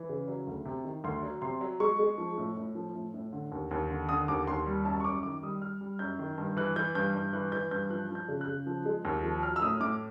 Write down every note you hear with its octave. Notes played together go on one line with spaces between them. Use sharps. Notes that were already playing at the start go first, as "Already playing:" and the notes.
Already playing: E3
C#3
F#3
D2
C3
D#3
D2 C6
F#3
C3 C6
F#3
G#3 C#6
G#3
F3
A2
A2
F3
A2
A2
D3
D#2
D#2
D3
D3 D#6
D#2 D6
D#2 C6
G3
F#2 A5
C#6
F#2 D6
D#3 D6
G3 D#6
G3 F6
G3
F#2 G6
D#3
G2
E3 F#6
E3 G6
G2 G6
G2
E3 F#6
E3 G6
G2 G6
F3 F#6
F3
G6
C#3
F#6
C#3
F3
G#3
D#2
F3
F#3 F6
E6
A2 D#6
A2 D6